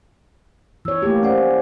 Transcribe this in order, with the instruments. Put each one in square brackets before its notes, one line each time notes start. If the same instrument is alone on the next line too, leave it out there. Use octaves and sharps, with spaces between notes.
[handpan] E3 C#5 [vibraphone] E6
[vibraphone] A3 [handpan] A#3 G4
[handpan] C#4 [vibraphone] C5 D5 F#5